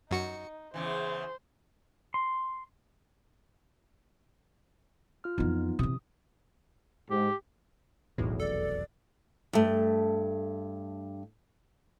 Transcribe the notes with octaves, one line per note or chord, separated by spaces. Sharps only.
F#2 D#4 F#4 C#7
E2 C#3 E3 C5
C6
F4 F6
F2 E3 B3 D#4 F4
C3 E3 D#6
G#2 G4
F1 B1 E2 A2
A4 D5
G2 A3